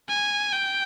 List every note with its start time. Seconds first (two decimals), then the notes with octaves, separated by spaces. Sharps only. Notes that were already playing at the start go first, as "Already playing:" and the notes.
0.09 G#5
0.53 G5